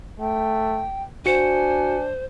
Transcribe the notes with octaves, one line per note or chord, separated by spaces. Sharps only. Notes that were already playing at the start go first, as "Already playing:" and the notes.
A3 G5
D4 F#4 C5 G#5 C#7